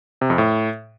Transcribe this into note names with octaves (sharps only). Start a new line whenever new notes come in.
C3
F2
A2